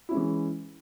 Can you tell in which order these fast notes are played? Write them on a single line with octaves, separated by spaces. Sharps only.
E4 C#4 G#3 E3